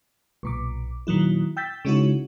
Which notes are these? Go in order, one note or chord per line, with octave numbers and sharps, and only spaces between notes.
B1 A#2 D6
A#2 D#3 F#3 E4
G5 E6 G6 A6 B6
C#3 G#3 C#4 D#4 E4 F#4